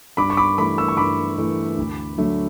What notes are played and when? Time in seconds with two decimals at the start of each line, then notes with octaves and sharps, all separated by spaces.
0.17 G2 B5 D6
0.30 C#6
0.37 B5 D6
0.58 E3 A3 B5 D6
0.78 C#6 E6
0.88 C#6
0.97 G2 B5 D6
1.38 E3 A3
1.77 D2
2.18 D3 F#3 A3